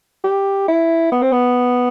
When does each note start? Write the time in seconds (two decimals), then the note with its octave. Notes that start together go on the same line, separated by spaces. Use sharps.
0.24 G4
0.68 E4
1.12 B3
1.22 C4
1.32 B3